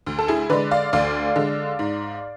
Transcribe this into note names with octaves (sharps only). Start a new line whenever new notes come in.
D2
A4
E4 G#4
D3 G#3 B4 D5
D5 F5
D2 D5 F5
D3 G#3
G#2